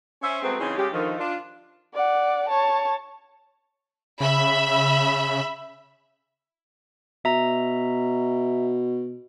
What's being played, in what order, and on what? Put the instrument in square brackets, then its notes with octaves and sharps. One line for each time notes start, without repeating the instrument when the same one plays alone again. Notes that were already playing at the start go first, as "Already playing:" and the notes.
[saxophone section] C#4 C5 E5
F#3 G#3 A3 B3 C4
C#3 E3 C4 C#4 D#4 G#4
C#3 G#3 C#4 G4
D3 D#3 F3
D4 F4
[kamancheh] D5 F#5
C#5 A5
[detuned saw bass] C#3 [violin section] E5 B5
[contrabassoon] B2 [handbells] E5 A#5